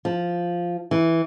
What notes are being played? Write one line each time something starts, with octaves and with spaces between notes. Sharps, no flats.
F3
E3